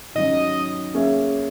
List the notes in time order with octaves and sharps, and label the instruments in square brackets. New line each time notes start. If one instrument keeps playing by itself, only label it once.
[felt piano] D#3 F#3 C#4 [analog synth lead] D#5
[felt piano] A#3 C#4 G#4 C#5 E5